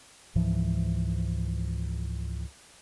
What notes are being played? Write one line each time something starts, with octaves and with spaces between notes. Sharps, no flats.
C#2 G#2 E3 F3